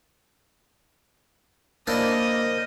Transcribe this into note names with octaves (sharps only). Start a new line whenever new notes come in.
A#3 D4 E4 A#4 C5 D#5